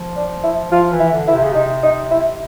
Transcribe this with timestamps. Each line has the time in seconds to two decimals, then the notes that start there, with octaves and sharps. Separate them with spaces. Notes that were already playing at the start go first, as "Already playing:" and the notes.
Already playing: F3
0.16 D4
0.43 E4
0.71 F3 F4
0.92 E3
0.99 E4
1.13 D3
1.28 E4
1.34 C3
1.43 C#3
1.53 C3 D#4
1.83 D#4
2.11 E4